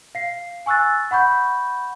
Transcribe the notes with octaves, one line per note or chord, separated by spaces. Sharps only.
F5 C7
G#5 C#6 E6 F#6 A6
F#5 B5 C#6 G6